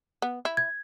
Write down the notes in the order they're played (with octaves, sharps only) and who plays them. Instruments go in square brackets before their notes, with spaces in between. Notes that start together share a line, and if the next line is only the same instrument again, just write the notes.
[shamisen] B3
E4
[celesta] G#6